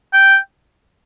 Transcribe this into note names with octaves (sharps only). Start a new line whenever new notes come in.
G5